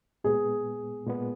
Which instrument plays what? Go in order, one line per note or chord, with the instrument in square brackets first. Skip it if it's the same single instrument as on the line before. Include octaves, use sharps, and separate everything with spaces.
[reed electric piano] A#2 G#3 B3 [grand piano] G#4
[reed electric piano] A#2 G#3 B3